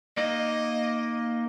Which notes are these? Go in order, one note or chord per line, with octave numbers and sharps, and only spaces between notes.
A#3 D#4 D#5